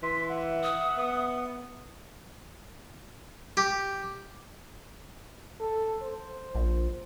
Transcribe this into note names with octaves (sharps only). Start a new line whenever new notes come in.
E3 C6 B6
E5 F#5
D#6
B3
G4
A4
C5
A#1